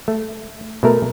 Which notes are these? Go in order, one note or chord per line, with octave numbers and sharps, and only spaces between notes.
A3
B2 A3 A#4